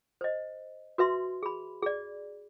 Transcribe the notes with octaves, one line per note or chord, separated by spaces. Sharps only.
C5 D#5
F#4 B4 E5 C6
G#4 B5
G#4 D5